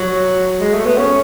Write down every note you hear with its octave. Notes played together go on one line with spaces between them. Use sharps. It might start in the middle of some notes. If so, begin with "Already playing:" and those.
Already playing: F#3
G#3
A3
B3
C#4